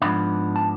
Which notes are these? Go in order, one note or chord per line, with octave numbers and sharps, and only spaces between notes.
G#2 F3 B3 D4 B5
A5